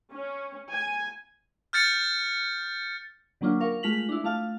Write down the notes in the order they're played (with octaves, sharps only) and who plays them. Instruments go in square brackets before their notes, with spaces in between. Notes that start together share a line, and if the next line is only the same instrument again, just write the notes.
[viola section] C#4
G#5
[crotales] F6 G6 A6 C#7
[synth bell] D3 F#3 A#3 C#4 D4 F4
A#4 F5 C#6
G#3 A3 F4 B6 F7 F#7
D4 E4
A3 F4 F5 A5 F6